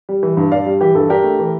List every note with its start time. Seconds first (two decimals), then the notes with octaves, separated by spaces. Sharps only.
0.09 G3
0.23 E3
0.37 G2
0.52 G2 D5 F5
0.66 G3
0.81 E3 G4
0.95 G2 A4
1.09 D4 G4 A#4
1.24 A3
1.39 E3